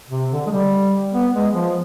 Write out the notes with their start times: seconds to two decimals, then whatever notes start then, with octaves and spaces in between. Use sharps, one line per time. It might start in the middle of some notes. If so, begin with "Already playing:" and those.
0.10 C3
0.31 D3
0.47 G#3
0.51 G3
1.13 B3
1.34 G#3
1.54 F3